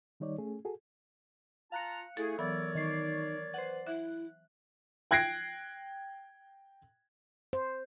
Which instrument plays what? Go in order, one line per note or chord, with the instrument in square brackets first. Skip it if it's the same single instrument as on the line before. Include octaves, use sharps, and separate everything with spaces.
[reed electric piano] D#3 G3 D#4 C#5 D5
A3 C#4 G#4
F#4 G#4 A4
[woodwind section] F4 A5 A#5 [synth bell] F5 F#6 C#7
[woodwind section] A3 G#4 [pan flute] E4 [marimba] A4
[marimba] E3 F#3 B3 [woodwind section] A#4 C#5 D5 [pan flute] E6
[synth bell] D#3 C#6 C7 [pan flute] D#4
[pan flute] B4 [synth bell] C5 F#5
[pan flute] E4 [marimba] E5 [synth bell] F#6
[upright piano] G5 F#6 G#6 A#6 C7 D7
[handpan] C5